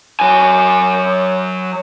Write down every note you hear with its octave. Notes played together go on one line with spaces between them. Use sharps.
F#3 G#5